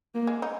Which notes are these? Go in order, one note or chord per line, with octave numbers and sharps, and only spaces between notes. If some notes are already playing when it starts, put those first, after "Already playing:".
A#3
G#3
D#4